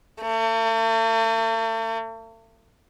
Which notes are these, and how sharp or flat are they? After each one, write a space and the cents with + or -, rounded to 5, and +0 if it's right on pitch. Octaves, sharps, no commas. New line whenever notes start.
A3 +45